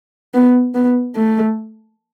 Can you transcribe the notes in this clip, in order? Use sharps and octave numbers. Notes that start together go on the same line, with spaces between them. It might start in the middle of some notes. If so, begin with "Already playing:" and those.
B3
B3
A3